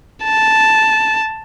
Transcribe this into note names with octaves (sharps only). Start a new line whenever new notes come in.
A5